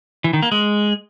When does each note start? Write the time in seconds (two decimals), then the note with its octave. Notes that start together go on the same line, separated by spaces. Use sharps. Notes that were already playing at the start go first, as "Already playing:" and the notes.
0.24 E3
0.33 D#3
0.43 A#3
0.52 G#3